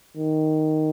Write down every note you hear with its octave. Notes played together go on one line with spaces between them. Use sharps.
D#3